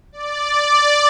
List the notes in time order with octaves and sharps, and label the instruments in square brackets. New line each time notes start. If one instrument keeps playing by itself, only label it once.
[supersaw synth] D5